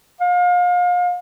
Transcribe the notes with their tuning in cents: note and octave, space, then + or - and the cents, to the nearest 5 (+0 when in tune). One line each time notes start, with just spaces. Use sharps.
F5 +35